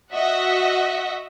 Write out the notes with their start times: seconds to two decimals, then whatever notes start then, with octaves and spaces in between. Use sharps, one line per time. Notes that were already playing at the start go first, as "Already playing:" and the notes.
0.11 F#4 D#5 E5 F#5